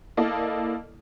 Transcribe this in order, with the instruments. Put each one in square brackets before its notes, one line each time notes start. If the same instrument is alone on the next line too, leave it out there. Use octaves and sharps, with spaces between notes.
[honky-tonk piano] A#3 E4 A4 D5 D#5